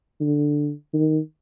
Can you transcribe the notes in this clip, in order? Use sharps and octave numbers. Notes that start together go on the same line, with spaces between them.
D3
D#3